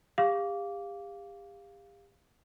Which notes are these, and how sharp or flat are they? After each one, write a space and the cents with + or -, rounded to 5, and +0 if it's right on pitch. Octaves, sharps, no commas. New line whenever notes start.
G4 +40 F5 +0 D6 -15